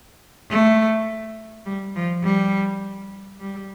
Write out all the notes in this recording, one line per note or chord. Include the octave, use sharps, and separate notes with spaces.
A3
G3
F3
G3
G3